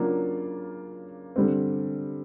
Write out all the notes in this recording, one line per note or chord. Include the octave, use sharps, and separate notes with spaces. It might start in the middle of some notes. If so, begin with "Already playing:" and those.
Already playing: C#3 F#3 A#3 D4 F4
D3 G3 C4